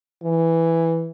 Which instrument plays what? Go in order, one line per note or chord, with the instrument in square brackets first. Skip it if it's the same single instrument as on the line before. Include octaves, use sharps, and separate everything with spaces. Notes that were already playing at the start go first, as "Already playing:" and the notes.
[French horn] E3